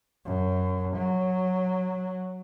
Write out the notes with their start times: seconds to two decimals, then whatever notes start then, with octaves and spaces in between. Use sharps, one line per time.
0.26 F#2
0.96 F#3